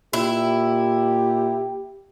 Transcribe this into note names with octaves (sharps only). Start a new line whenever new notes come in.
A#2 E4 G4